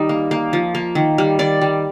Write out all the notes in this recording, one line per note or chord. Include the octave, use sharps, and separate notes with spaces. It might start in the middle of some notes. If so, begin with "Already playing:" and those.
Already playing: D#3 G3 D#4
A#3
A#3
F3
A#3
D#3
G3
D#3 D5
G3